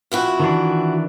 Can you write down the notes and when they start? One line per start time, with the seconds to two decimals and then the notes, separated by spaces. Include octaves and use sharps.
0.12 F2 E4 F#4
0.40 D#3 E3 D4